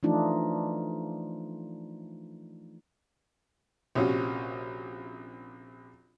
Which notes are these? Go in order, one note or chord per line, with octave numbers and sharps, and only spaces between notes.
E3 F3 A3 D4 D#4 F4
A#1 C3 C#4 F#4